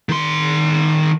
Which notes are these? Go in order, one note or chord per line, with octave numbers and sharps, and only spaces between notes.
D#3 C6